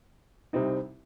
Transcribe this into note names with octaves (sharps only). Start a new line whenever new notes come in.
C2 C3 G3 C4 D#4